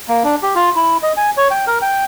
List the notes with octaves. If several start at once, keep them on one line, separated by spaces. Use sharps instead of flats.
A#3
D4
G4
F4
E4
D#5
G#5
C#5
G5
A#4
G5